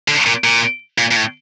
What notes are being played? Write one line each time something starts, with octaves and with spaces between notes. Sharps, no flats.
D3
A#2
A#2
A#2
A#2
A2